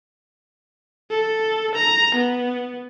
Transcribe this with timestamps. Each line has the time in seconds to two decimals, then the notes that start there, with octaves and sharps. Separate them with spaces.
1.11 A4
1.75 A#5
2.15 B3